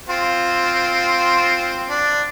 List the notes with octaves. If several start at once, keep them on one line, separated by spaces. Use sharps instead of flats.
C4 F4
D4